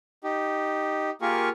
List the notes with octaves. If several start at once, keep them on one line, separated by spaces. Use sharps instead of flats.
D#4 G4
A#3 F4 G4 G#4 A#4 C#6